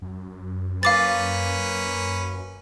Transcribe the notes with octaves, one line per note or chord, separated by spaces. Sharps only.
F#2
A#3 C#4 B4 F5 D6 A6